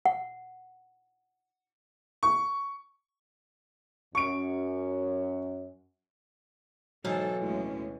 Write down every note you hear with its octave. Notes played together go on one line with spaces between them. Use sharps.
F#5
C#6
F#2 C#4 C#6 D7
G#2 B2 E3 F#3 A4 F5
D2 A2 G#3 C#4